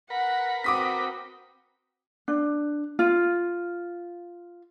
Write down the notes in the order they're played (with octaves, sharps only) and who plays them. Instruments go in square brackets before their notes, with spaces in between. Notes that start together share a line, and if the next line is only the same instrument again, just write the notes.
[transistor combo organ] A#4 B4 B5 [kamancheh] F#5
[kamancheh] C4 F#4 [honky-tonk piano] D6 D#6 B6
[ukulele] D4
F4